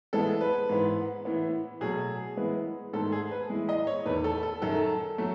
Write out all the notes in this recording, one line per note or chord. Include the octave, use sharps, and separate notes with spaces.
A2 E3 G#3 B3 A4
B4
G#2 E3 B3
A2 E3 B3
B2 F#3 A3 G#4
A2 E3 G#3 B3
G#2 D#3 A3 A4
G#4
B4
A2 E3 G#3
D#5
C#5
E2 D#3 A3 B4
A4
A4
F#2 D#3 F#3 A4
F#3 A3